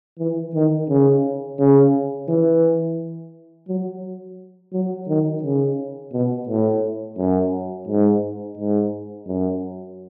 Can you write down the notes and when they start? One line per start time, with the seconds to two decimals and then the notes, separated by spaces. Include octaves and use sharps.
0.19 E3
0.55 D#3
0.89 C#3
1.59 C#3
2.29 E3
3.68 F#3
4.73 F#3
5.08 D#3
5.43 C#3
6.13 B2
6.48 A2
7.18 F#2
7.88 G#2
8.57 G#2
9.27 F#2